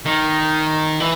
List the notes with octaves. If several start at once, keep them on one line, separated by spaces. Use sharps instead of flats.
D#3
E3